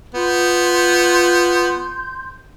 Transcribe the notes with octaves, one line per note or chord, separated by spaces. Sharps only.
B3 F4 C6 G6